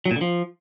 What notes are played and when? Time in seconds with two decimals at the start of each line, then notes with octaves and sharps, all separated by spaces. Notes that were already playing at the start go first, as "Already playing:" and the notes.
0.06 F#3
0.11 A#2
0.16 D3
0.21 F3